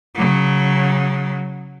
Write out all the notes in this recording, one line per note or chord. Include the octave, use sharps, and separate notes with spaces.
C#3 F#3